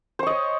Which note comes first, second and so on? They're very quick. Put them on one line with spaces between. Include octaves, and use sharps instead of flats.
C5 C#6 D#5 C#5